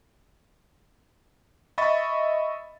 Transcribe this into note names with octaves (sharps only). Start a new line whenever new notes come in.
D#5 E5 B5 C#6 A6